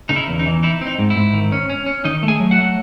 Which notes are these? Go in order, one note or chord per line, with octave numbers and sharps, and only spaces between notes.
C#3 D#4
E4
E2
D#4
E3
D#4 E4
C4
D#4
G#2
E4
G#2
D#3
C#4
C#4
C#4
D#3 D#4 D#5
A3
G#4 G#5
F#3
F#4 F#5
A3